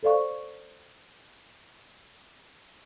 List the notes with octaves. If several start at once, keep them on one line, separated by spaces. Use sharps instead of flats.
A4 C5 D5 F5 C#6